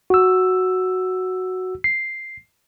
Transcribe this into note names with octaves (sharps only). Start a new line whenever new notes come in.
F#4 E6
C7